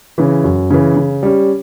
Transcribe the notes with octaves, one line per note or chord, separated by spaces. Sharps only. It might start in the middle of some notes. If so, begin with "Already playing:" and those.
C#3 E3
F#2
C#3 E3
C#3
G3 C#4